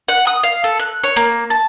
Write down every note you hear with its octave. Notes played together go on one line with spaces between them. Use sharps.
F#5
D#6
F5
A4
F#6
C#5
A#3
A5